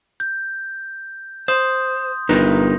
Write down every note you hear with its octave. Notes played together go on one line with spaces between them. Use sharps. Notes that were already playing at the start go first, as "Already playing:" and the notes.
G6
C5 C6 D#6 G6
G1 D#4 A#4 B4